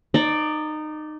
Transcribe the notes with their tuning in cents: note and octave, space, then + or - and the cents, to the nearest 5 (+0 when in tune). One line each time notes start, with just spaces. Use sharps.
D#4 -20 D5 +5